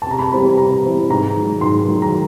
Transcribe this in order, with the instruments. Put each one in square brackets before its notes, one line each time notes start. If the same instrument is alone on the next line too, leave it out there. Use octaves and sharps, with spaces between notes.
[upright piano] A5
C3 A#5
B5
E3 G3 C4 E4 B5
C3 A#5
E3 G3 C4 E4
G#2 A#5
D#3 F#3
G#2 C6
D#3 F#3
A#5